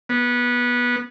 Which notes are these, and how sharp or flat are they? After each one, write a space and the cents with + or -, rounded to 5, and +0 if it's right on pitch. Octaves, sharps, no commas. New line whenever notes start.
B3 -20